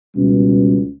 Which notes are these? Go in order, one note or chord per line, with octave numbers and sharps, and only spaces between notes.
C#2 B2 G3 C#4